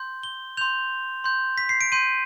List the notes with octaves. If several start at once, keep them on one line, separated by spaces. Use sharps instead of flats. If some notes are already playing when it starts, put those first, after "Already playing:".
Already playing: C6 G6
G7
C6 G6 F7
C6 G6
B6
C7
D7
C6 G6 D#7